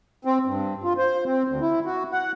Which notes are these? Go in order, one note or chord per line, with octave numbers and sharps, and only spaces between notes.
C4
G2
F4
C5
C4
D2
E4
F#4
F#5